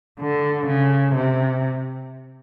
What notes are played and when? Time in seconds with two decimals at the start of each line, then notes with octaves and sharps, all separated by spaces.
0.20 D3
0.67 C#3
1.16 C3